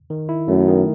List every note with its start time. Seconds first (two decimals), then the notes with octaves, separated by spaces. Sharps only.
0.10 D#3
0.29 E4
0.48 F#2 A3
0.68 D#3